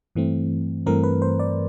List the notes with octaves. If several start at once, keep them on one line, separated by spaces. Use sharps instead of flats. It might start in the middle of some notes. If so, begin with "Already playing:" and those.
G2 E3 A3 C4
G2 E3 A3 C4 A#4
B4
C5
D5